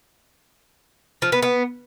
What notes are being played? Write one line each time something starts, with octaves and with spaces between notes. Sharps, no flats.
F3
B3
B3